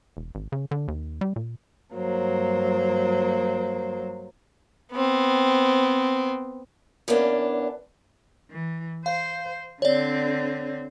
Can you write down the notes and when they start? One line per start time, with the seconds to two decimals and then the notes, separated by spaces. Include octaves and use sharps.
0.17 E1
0.35 G#1
0.52 C#3
0.71 D3
0.88 D#2
1.21 G3
1.36 A#2
1.94 G2 F#3 A#3 C5
4.93 B3 C4
7.08 E2 A#3 B3 C#4 D4
8.51 E3
9.06 C5 F5
9.82 D3 C4 C#5 D5